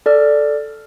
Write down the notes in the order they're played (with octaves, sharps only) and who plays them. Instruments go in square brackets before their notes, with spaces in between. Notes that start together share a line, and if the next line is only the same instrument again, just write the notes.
[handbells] A4 D5 F6